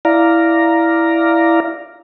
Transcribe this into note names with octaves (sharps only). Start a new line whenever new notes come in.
E4 D5 F5 A#5